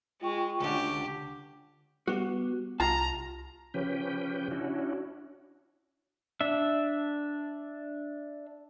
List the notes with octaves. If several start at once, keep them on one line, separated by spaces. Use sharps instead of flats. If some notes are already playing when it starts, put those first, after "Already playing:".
G#3 F4 G5 C#6
C#2 D3 G4
G3 B3 F#4
C2 F4 A5 A#5
C#3 F3 C#4 G4 B4 G5
C#4 D4 E4 F#4
D4 E5